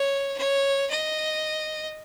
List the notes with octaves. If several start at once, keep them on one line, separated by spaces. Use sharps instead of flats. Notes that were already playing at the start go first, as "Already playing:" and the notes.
Already playing: C#5
C#5
D#5